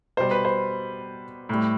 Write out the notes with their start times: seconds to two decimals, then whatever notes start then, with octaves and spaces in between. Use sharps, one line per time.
0.17 B2 G3 C5
0.31 B4
0.45 C5
1.49 A2 G3